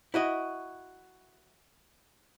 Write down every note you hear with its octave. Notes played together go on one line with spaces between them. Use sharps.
E4 F#4 D#5